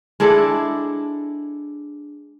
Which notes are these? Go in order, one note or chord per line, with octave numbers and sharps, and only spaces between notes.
G#3 D4 E4 A4